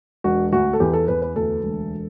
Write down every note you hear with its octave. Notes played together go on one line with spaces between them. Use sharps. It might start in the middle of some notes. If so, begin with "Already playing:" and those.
E1 F#4
D2 F#4
A4
E2 G4
A4
E2 B4
B4
D2 A4
E1